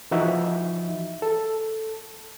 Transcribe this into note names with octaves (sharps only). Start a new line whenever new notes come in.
E3 F3 D#4 F#4 E5
A4